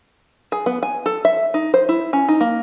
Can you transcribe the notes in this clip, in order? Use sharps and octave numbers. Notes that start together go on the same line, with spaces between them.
G#4
B3
G#5
A4
E5
D#4
C5
E4
C#4
D#4
A#3